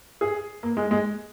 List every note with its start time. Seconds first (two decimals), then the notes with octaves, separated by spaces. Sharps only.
0.21 G#4
0.63 A#3
0.77 G#3
0.91 G#3